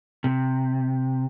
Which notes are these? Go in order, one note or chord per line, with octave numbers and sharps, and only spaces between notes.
C3